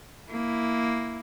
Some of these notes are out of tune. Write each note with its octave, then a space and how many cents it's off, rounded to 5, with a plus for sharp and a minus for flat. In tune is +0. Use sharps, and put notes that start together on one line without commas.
A#3 +0 E4 +0